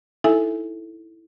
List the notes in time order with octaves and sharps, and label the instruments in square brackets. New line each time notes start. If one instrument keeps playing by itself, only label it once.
[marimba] D#4 E4 A4 E5 G#5